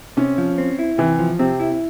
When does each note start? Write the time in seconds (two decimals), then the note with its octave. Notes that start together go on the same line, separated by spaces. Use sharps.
0.17 C3 C#4
0.38 F3
0.58 C4
0.79 E4
0.98 C3 E3
1.19 F3
1.39 C3 C4
1.60 E4